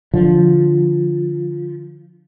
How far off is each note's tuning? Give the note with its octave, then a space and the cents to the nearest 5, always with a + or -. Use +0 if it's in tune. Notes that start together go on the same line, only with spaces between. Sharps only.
D3 +0 F3 +0